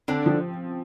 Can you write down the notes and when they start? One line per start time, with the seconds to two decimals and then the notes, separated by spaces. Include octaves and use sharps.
0.08 D3 C4 D4
0.26 F3